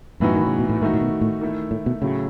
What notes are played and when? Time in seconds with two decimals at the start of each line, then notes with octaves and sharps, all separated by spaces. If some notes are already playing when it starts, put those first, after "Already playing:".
0.20 F#2 A2 E3 B3 D#4 F#4
0.36 D#3
0.46 C#3
0.59 B2
0.69 A2
0.81 G#2 D#3 A3 D#4 F#4
0.93 A2
1.01 B2
1.21 A2
1.41 D#3 A3 E4
1.71 A2
1.86 B2
2.02 A2 C#3 F#3 A3